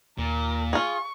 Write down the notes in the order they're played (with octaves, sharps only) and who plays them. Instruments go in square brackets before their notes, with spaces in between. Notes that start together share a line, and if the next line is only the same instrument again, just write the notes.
[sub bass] D#2 [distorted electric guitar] A#2 [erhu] A#4
[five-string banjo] F4 G#4 [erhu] C#6